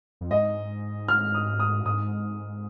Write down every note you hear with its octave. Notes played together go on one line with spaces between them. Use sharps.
F2
G#2 D#5
F6
D#6
D#6
G#2 D#6